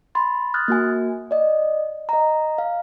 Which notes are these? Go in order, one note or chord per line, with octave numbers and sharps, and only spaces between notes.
B5 C6 A6
D#6 F6 F#6 G#6 A6
A#3 F#4 G#5
D5 D#5
D#5 A#5
F5